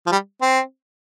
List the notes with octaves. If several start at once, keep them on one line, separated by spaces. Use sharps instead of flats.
F3
G3
C4